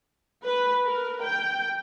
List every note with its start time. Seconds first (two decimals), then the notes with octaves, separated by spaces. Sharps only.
0.45 B4
0.85 A#4
1.23 G5